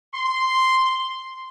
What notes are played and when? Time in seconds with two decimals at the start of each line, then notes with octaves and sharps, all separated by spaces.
0.13 C6